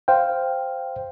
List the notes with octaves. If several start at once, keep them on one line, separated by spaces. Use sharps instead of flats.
C5 F5 G5